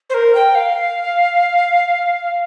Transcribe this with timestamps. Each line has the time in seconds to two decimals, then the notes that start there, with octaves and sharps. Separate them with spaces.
0.09 C5
0.14 A#4
0.35 G5
0.54 F5